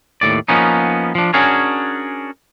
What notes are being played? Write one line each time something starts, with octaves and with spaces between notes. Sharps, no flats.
D#2 A2 D5
F3 A#3 B3 C#4 D#4
F3 D4
C#4 D4 F#4 G#4 A#4 C#5